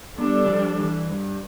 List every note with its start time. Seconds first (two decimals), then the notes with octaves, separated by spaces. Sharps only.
0.18 G3 B3 D4 A4
0.45 E3
0.49 F3
0.80 E3
1.10 G2